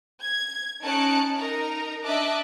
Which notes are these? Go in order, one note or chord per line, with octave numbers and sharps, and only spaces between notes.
G#6
C#4 D#4 A5 F#6 C#7 D7
D#4 A#4 A#5
D4 D#5 E5 A5 D6 F#6